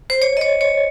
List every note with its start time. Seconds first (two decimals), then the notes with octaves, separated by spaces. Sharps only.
0.10 C5
0.22 C#5
0.37 D#5
0.41 C#5
0.61 C#5